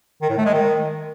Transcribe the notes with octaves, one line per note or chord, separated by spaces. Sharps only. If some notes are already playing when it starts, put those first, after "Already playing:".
D#3
A2
A3
G#3
D#3